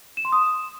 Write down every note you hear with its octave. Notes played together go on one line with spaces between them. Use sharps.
E7
C6
D#6